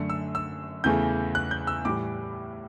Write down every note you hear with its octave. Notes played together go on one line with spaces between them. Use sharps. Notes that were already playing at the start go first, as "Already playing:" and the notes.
Already playing: F#2 D3 A3 C#7
E6
E6
E2 C#3 E3 A3 G6
F#6
G6
E6
A2 E3 G3 D6